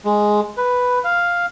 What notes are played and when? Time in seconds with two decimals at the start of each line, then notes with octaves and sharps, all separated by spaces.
0.05 G#3
0.57 B4
1.04 F5